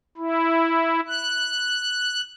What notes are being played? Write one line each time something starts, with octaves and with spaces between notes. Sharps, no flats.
E4
F#6